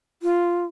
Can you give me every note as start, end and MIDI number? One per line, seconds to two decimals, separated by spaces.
0.23 0.65 65